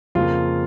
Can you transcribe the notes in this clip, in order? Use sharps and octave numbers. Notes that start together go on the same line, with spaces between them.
F2 C#3 F3 A#3 F4